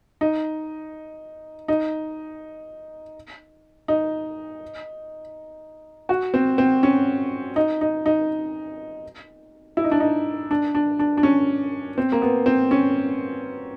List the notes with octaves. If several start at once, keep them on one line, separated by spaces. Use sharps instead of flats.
D#4
D#4
D#4
F#4
C4
C4
C#4
D#4
D#4
D#4
E4
D#4
D4
D#4
D4
D4
D4
D4
C#4
C4
A#3
B3
C4
C#4